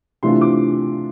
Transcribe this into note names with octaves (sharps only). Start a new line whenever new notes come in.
C3 E3 A3 D4 F4 C6
D6